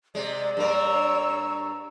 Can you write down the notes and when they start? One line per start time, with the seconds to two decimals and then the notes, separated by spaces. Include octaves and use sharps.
0.15 C3 G#3 D5
0.57 G2 A#3 A#4 C#5 E6